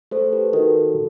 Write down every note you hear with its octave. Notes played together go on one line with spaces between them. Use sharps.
A3 A4 C5
G4 B4
D#3 F#4 A4